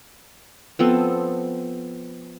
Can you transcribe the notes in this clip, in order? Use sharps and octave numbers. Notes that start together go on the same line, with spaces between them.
F3 B3 C4 A4